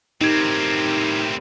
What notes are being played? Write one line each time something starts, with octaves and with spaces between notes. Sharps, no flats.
A2 C4 D#4 G4 A#4 G#6